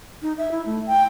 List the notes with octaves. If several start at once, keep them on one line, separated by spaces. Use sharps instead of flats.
D#4
E5
E4
A3
G5